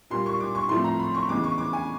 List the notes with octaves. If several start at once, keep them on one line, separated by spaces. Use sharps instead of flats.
A#2 G3 A#3 C6
C#6
D6
C#6
A2 F3 A3 C4 C6
A#5
B5
C#6
E2 C#3 E3 G#3 B3 D6
C#6
D6
G#5